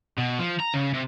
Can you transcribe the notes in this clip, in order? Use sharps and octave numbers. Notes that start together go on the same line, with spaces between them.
B2
F3
A#5
C#3
C3